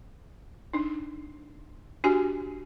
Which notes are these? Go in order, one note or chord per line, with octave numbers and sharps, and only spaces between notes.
D4 D#4
D4 F#4 G4 G#5